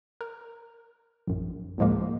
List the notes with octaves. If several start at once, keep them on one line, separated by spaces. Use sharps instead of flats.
A#4
A#1 F#2
D2 A2 F3 G#3 A#3